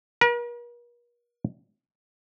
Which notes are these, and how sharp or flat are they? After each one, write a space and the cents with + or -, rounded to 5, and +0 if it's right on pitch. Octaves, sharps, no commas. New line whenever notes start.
A#4 +45